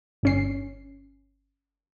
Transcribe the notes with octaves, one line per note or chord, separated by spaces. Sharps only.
G1 C#4 C7